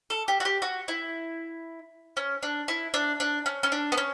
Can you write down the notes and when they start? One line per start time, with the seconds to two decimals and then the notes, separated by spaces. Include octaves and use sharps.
0.10 A4
0.28 G4
0.40 F#4
0.45 G4
0.62 F#4
0.88 E4
2.17 C#4
2.43 D4
2.68 E4
2.94 D4
3.20 D4
3.46 C#4
3.63 C#4
3.72 D4
3.92 B3
3.98 C#4